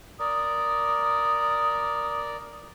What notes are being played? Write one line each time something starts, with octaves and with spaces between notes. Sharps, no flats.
A#4 D5 D#6